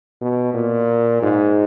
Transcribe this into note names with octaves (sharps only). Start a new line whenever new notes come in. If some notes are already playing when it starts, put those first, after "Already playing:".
B2
A#2
G#2